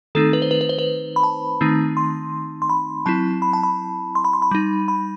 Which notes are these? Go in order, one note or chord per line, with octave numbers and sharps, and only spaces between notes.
D#3 A3 C4 D#4 A4
B4
C5
B4
B4
C5
B4
B5
A5
D#3 A3 C4 D#4
C6
C6
B5
F#3 C4 E4 A5
B5
A5
B5
C6
B5
C6
B5
G3 D#4
B5